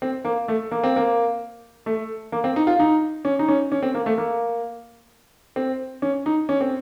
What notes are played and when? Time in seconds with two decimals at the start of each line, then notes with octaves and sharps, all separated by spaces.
0.02 C4
0.25 A#3
0.48 A3
0.71 A#3
0.84 C4
0.96 A#3
1.86 A3
2.32 A#3
2.44 C4
2.56 D#4
2.67 F4
2.80 D#4
3.25 C#4
3.39 D#4
3.48 C#4
3.72 C#4
3.83 C4
3.95 A#3
4.06 A3
4.18 A#3
5.56 C4
6.02 C#4
6.26 D#4
6.49 C#4
6.61 C4